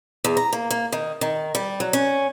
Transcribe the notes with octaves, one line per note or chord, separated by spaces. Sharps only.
E2
A#5
A#3
A#3
D#3
D#3
G3
F#3
C#4